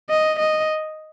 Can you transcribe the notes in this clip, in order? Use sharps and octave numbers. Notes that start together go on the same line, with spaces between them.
D#5
D#5